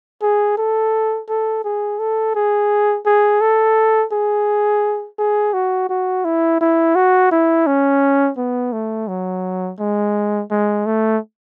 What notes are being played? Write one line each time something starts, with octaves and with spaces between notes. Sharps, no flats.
G#4
A4
A4
G#4
A4
G#4
G#4
A4
G#4
G#4
F#4
F#4
E4
E4
F#4
E4
C#4
B3
A3
F#3
G#3
G#3
A3